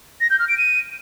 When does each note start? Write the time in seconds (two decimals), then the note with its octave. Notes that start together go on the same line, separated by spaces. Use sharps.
0.21 A#6
0.30 G6
0.39 F6
0.48 D7
0.58 D#7